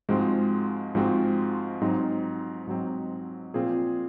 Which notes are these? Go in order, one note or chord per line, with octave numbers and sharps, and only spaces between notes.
G#2 F3 G#3 C4 F#4
G#2 F3 G#3 C4 F#4
G#2 F#3 C4 D#4
G#2 F#3 C4 D#4
A#2 F3 C4 F4 G#4